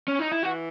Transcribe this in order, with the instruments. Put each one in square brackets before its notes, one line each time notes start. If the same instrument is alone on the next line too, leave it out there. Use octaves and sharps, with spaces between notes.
[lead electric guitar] C#4
D#4
E4
[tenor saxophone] E3 [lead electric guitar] F#4